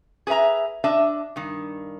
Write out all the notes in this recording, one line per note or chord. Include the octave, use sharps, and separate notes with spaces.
G#4 B4 C#5 E5 A#5
D4 D#5 E5 A5
G2 D#3